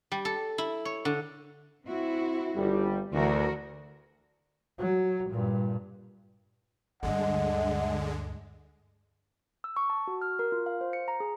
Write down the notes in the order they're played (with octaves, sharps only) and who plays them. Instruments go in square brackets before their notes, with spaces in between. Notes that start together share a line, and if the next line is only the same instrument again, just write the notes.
[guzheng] G3
A4
E4
C#5
D3
[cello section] C4 E4 F#4
[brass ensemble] G1 G3
[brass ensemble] D2 [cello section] E3 F#4 A#4
[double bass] F#3
G2 A#2
[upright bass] D2 G2 [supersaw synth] D3 G#3 [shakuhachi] D#5 [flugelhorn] F#5
[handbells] E6
C#6
A5
F#4
F6
A#4
F4
F5
C5
C#7
A#5
G#4